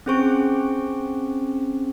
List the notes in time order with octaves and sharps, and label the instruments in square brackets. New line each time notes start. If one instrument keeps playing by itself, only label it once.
[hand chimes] C4 C#4 G#4 C5 C#6 D7